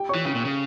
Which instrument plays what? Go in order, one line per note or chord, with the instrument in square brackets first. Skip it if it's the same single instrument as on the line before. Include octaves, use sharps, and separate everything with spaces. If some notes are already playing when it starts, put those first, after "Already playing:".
Already playing: [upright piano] G4 G5
C#5 C#6
[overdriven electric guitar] E3
C#3
A#2
C#3